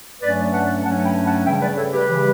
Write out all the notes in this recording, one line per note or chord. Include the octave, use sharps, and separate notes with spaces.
G2 F#3 A3 C#4 B4 D5
F#5 A5
G2 F#3 A3 C#4 F#5 A5
G5 B5
F#5 A5
C#3 E3 G3 E5 G5
B4 D5
A4 C#5
G4 B4
C#3 E3 G3